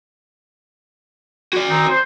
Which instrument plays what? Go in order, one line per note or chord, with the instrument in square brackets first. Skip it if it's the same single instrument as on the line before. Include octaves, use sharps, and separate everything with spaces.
[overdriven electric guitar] F#4 D5
[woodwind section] D#3 C4 D#4
C5